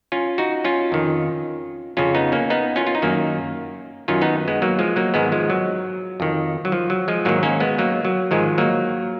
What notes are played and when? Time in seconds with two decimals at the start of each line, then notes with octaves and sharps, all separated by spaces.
0.12 C#4 F4
0.38 D#4 F#4
0.64 C#4 F4
0.92 F2 D#3
1.97 F2 C#3 C#4 F4
2.15 B3 D#4
2.32 A#3 C#4
2.50 B3 D#4
2.76 C#4 F4
2.87 F4
2.95 D#4
3.02 F#2 D#3 A#3 C#4
4.08 F#2 D#3 C#4 F4
4.21 B3 D#4
4.48 G#3 B3
4.62 F#3 A#3
4.79 F3 G#3
4.96 F#3 A#3
5.14 G#2 D#3 G#3 B3
5.32 F3 G#3
5.50 F#3
6.20 F2 D#3
6.65 F#3
6.72 F3
6.90 F#3
7.08 F3 G#3
7.25 G#2 D#3 F#3 A#3
7.43 A#3 C#4
7.60 G#3 B3
7.78 F#3 A#3
8.05 F#3
8.31 G#2 D#3 F3 G#3
8.58 F#3 A#3